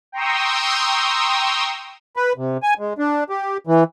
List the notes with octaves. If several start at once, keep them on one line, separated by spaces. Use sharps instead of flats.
G5 A#5 C6 C#6 D#6 E6
B4
C3
G#5
G#3
D4
G4
E3